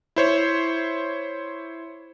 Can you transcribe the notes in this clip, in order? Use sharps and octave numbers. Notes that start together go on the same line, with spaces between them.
E4 C5 C#5